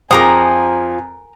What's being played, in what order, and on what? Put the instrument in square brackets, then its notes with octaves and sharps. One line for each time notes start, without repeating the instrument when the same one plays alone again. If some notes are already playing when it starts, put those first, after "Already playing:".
[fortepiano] F2 G#4 D6 [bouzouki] F3 [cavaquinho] A#4 A#5 D#6 [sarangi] G#5